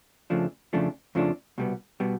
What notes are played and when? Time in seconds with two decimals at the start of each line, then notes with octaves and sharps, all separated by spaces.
0.30 F2 C#3 F3 A3 D4
0.73 F2 C#3 F3 A3 D4
1.15 F2 C#3 F3 A3 D4
1.58 C2 B2 G3 B3
2.00 B2 G3 B3